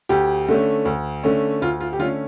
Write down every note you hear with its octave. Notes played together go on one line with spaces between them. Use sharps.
D2 G4
D3 A3 C#4
D2
D3 A3 C#4
D2 F4
F4
G4
D3 A3 C#4 F4